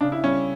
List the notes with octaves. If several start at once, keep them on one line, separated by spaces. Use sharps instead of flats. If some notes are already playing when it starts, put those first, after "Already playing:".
C#3 D4
E4
G3 C#4